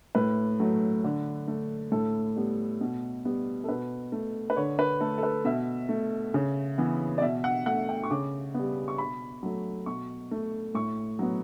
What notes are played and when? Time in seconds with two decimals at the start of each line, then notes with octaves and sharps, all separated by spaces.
0.15 A2 B4
0.60 F#3 A3
1.04 D3
1.48 A3
1.92 A2 A4
2.36 G3 B3
2.81 B2
3.25 G3 B3
3.64 A4
3.69 B2 B4
4.12 A3
4.50 B4
4.56 D3 C#5
4.79 B4
5.01 A3 A4
5.18 A4
5.23 B4
5.45 B2 E5
5.89 A3
6.34 C#3
6.78 E3 B3
7.18 D5
7.21 B2 E5
7.44 F#5
7.66 A3 F#5
7.89 G5
8.04 C#6
8.10 C#3 D6
8.54 G3 B3
8.88 C#6
8.98 B2 B5
9.43 F#3 A3
9.86 B2 C#6
10.31 A3
10.75 A2 C#6
11.19 F#3 B3